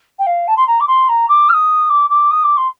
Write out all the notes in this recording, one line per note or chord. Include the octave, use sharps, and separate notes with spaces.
G5
F5
A5
C6
A#5
D6
C6
A#5
D6
F6
D#6
D6
D6
D#6
D6
C6